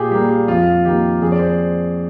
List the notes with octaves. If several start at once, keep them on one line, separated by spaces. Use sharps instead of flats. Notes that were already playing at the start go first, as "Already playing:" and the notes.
Already playing: A#2 G4 G#4
G3 A#3 G4
G4
F2 F4
D#3 A#3 G4
F2 G#4
D5
C5